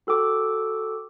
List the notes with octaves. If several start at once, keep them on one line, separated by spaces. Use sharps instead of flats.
F#4 A4 G5 D6